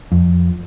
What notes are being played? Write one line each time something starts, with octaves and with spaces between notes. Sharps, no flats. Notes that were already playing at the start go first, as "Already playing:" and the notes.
F2